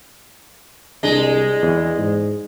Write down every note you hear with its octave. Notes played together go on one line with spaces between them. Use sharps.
C2 G#3 D4 D#5
E2
G#2